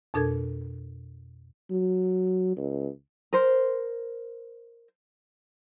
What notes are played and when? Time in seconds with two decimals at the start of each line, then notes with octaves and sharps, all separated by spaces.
0.14 F2 B2 D4 A4 A#4 G#6
1.70 F#3
2.57 C#2
3.33 A#4 C5